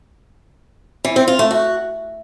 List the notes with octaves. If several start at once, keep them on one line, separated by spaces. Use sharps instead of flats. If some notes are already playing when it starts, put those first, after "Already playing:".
E3
C4
F4
A3
F#4